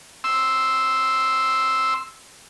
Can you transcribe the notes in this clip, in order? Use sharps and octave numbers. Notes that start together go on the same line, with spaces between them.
C6 E6